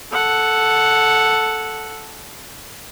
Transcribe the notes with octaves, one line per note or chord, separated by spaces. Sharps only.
A4 F#5